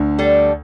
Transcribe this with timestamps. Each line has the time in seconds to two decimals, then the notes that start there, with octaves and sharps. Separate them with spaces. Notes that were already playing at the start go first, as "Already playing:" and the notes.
Already playing: D2 D3
0.19 G3 D4 A4